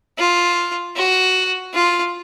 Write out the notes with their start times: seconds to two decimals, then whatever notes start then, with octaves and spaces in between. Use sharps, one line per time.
0.19 F4
0.96 F#4
1.74 F4